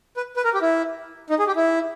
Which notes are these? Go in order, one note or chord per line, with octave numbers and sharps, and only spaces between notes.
B4
B4
A#4
G4
E4
D#4
G#4
G4
E4